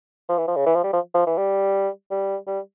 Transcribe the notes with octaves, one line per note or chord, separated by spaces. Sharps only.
F3
E3
F3
C#3
E3
F3
G3
F3
F3
E3
G3
G3
G3